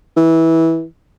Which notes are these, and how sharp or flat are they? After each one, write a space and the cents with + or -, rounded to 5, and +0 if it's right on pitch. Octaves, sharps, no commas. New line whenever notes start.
E3 -15